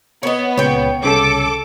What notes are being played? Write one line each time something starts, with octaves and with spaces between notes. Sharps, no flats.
B3 C#5 D#5
C#2 A#2 C#3 C#5 G5
C2 C#3 A4 D6